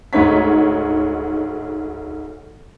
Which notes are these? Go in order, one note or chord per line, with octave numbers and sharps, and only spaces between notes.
D2 G#2 D#4 C#5 B6